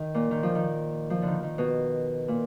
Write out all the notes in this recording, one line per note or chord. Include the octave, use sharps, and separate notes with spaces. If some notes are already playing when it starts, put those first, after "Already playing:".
Already playing: D#3
A#2
D#3
F3
D#3
F3
D3 D#3
D#3
B2
A#2